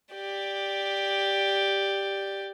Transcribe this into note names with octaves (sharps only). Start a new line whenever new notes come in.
G4 D5